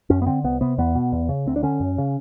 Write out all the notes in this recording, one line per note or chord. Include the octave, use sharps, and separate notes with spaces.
F#2 C#4
B3
D3 C4
C2 B3
C3 B3
E2 B3
B2
E2
C#3
D2 C4
D4
D3 C#4
F#2
C#3